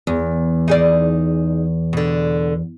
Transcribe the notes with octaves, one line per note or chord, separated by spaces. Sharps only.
E2
D#4 G#4 D5
B2 D3